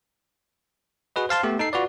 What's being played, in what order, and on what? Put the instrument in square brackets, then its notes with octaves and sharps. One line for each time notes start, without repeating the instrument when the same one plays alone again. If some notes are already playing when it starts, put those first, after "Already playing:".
[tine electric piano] F#4 G#4 B4 D#5
C5 F5 A5 C6
A3 B3 G4
D#4 A4 C7
F4 F#4 B4 D5